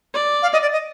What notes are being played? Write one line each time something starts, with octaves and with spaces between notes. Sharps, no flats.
D5
F5
D#5
D5
D#5